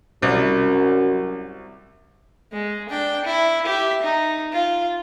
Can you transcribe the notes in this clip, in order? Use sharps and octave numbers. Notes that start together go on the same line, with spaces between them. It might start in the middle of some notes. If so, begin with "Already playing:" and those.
C2 F#2
G#3
D4 G5
E4
G4 E5
D#4
F4